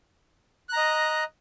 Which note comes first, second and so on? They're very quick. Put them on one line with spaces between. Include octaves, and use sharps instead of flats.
F#6 A#5 D#5